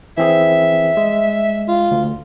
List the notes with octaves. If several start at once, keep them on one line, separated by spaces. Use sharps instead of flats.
E3 C4 G#4 E5
G#3
F4
D2